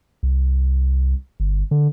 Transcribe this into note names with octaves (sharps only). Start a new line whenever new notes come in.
C2
G1
D3